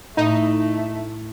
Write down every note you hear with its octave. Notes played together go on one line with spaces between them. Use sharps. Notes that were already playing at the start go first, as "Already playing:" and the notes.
A2 A3 D#4